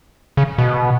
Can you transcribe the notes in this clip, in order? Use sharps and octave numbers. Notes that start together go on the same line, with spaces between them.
C#3
B2